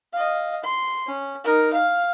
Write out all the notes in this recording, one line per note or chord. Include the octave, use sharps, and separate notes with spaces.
D#5 F5
C6
C#4
D#4 A#4
F5